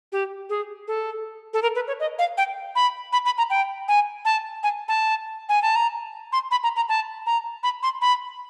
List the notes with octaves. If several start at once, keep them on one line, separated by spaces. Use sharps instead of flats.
G4
G#4
A4
A4
A#4
B4
C#5
D#5
F5
G5
B5
B5
B5
A#5
G5
G#5
A5
G#5
A5
G#5
A5
A#5
C6
B5
A#5
A#5
A5
A#5
B5
C6
B5